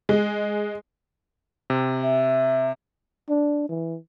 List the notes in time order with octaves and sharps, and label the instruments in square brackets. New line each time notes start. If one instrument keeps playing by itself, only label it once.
[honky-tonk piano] G#3
[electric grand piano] C3
[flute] E5
[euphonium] D4
E3